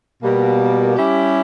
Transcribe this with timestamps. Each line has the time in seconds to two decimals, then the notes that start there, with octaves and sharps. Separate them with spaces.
0.22 B2 G3 A#3
0.96 G3 C#4 E4 G4